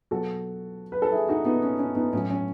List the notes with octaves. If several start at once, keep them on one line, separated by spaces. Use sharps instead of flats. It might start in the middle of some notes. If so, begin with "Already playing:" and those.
B2 F#3 F#4 A4
B4
A4
E4 G#4
D#4 F#4
B3 D#4
C#4
C#4
B3 D#4
A2 F#3 C#4
C#4